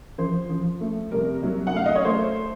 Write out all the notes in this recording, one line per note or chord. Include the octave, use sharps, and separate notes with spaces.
F3 C5
F3
A3
C2 A#4
F#3
F#5
A3 F5
D#5
C#5
A3 C5